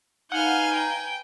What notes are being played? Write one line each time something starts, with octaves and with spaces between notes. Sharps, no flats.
D#4 B4 F5 F#5 G#5 F6 G6
G5 A#5